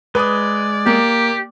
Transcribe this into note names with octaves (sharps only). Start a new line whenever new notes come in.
G#3 B4 D5 D#6
A#3 G4